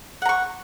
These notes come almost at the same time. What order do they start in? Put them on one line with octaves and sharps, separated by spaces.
F#5 A#5 C#6